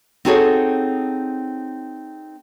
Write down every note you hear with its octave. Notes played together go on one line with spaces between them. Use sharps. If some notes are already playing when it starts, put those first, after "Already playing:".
C4 D#4 F#4 G#4 A4 C#5